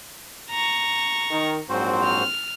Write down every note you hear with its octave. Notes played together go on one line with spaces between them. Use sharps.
A#5 C#6
D#3
A#1 G#2 F#3 C4 F#4 C5
F6